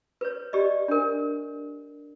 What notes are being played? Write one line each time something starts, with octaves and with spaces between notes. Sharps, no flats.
B4 C#5
G4 D5 D#5
D4 A#4